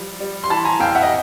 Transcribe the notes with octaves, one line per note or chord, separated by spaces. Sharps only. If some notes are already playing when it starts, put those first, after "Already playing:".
Already playing: F3 G3
G3
C6
E3 A5 B5
G#5 A#5
F2 F5 G5
E5 F#5
D#5